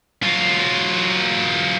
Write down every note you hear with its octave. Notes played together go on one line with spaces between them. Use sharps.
F#3 F4